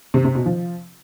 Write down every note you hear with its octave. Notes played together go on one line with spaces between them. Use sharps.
C3
C3
B2
F3